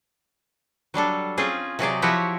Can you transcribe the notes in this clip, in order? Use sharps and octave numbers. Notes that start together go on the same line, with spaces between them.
F#3 G3 D4 A4
C4 C#4 F4 G#4
C3 F#3 G#4 D5
F3 E4 F#4 G4 C#5